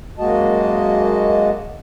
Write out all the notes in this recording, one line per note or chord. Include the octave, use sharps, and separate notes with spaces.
F#2 G#3 A#3 F#4 D#5 A5